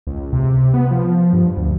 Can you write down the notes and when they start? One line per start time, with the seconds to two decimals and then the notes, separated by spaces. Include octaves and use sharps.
0.07 C#2
0.33 C3
0.74 B3
0.91 F3
1.33 G2
1.57 D2